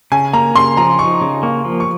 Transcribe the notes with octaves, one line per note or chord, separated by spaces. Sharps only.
C#3 G#5
A#3 A#5
C#3 C6
F3 A#5
D#4 C#6
C#3
A#3 C#6
F3
C#6